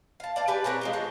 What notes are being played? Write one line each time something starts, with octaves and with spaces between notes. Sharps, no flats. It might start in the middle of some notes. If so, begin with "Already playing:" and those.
F5 A5
D5 F5 A5
G4 B4 G#5
C4 A#4 B4 C#5
G#3 A#3 F4
D4 F4 C5 C#5